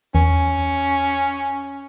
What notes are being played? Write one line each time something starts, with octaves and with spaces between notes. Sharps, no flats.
E2 C#4